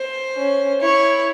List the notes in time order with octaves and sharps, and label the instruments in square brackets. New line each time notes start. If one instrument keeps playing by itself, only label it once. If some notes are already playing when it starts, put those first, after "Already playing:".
Already playing: [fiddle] C5
[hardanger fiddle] C#4
[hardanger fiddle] E4 [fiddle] C#5